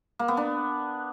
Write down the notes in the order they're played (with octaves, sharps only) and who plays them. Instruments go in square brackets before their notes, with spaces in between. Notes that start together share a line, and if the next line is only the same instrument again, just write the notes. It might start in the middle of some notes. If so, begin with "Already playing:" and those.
[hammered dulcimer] A#3
B3
D4